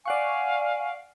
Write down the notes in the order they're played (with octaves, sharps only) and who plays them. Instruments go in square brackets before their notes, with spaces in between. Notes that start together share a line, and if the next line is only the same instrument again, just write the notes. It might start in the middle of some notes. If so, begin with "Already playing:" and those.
[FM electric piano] D5 F#5 C#6 [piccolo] F5 [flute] G#5